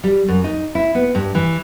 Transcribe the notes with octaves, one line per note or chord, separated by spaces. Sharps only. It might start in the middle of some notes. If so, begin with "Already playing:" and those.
G3
F#2
D#4
E4
B3
G2
E3